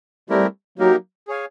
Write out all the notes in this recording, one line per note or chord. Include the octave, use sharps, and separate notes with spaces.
G3 A3 C4 E4 G4 A#4
F#3 A#3 D#4 G4 A#4
G#4 C#5 F5 G#5